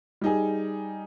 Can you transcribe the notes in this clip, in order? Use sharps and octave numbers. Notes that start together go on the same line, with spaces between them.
G3 D#4 G#4